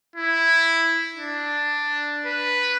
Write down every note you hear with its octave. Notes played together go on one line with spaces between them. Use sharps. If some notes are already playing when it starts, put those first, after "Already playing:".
E4
D4
B4